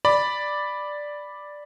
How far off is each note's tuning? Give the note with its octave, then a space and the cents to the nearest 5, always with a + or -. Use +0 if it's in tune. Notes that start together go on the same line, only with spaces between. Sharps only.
D5 +0 B5 +0